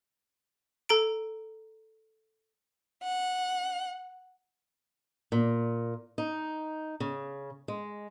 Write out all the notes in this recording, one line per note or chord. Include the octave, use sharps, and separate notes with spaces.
A4 A#5 D7
F#5
A#2
D#4
C#3
G#3